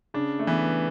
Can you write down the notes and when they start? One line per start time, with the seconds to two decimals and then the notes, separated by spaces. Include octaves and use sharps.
0.14 C#3 D4
0.39 A3
0.47 E3 B3